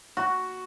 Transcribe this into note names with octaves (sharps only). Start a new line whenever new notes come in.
F#4